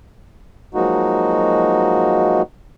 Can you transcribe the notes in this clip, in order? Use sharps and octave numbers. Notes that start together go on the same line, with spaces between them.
F3 F#3 G#3 A#3 D#4 F#4